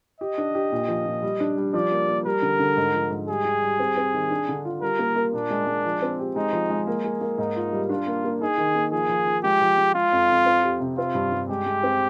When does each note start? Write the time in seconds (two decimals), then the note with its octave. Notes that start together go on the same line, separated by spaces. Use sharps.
0.21 G4 D#5
0.38 D4
0.55 G4
0.72 A#2
0.88 F3
1.06 A#2
1.22 G3
1.40 D4
1.57 G3
1.74 F3 D5
1.92 A#3
2.08 A#3
2.26 G3 A#4
2.42 D3
2.59 D3
2.77 G#2
2.94 F3
3.11 G#2
3.28 G3 G#4
3.45 G4
3.62 G3
3.79 C4
3.97 C4
4.14 D#3
4.31 D4
4.49 D3
4.65 F4
4.82 G3 A#4
4.99 A#3
5.16 A#3
5.33 A#2 D4
5.50 G#3
5.67 G#3
5.85 F3
6.02 C4
6.19 G4
6.36 G#3 D#4
6.53 F3
6.70 G#3
6.87 A#3
7.05 G#4
7.21 A#3
7.38 G#2 D#4
7.56 F4
7.72 G3
7.89 D4 F4
8.07 A#3
8.25 A#3
8.41 D#4 G#4
8.58 D#3
8.75 A#3
8.92 F3 G#4
9.09 F3
9.27 F3
9.44 G#3 G4
9.61 F3
9.78 G#3
9.95 G#3 F4
10.12 F2
10.30 F2
10.46 C4
10.64 G4
10.80 C3
10.98 C4 F4
11.15 G2
11.32 G2
11.49 G#3 G4
11.66 G#3
11.83 C4